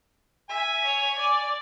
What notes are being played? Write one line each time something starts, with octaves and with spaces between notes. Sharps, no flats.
E5 G#5
C#5
D5